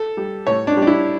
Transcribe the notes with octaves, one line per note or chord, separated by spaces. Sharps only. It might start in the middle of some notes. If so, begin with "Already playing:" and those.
Already playing: A4
G3
A2 C#5
D4
G3
D4
E4